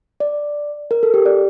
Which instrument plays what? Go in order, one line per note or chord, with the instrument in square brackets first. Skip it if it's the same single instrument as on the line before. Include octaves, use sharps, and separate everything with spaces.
[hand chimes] D5
A#4
A4
G4
D5